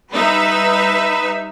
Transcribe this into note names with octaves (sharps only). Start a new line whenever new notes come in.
G3 D#4 B4 E5